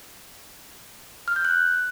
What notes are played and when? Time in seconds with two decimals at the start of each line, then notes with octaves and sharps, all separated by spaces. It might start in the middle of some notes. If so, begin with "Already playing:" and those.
1.28 F6
1.36 G6
1.45 F#6